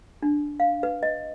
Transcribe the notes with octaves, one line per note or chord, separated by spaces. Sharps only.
D4
F5
B4
D#5